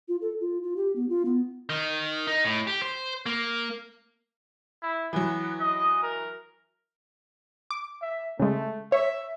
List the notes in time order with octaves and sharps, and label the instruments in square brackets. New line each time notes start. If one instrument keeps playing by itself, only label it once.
[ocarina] F4
A4
F4
F4
G4
B3
F4
B3
[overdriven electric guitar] D#3
D#4
A2
G4
C5
A#3
[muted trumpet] E4
[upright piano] E3 F#3 [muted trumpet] B3
[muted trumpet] D#5
A#4
[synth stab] D6
[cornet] E5
[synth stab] C#3 G#3 [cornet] A3
[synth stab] C#5 [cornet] E5